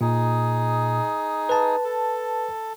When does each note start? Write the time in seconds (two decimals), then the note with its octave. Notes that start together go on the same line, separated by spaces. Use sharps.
0.01 A#2 D#4 G#4
1.49 B4 A5
1.84 A4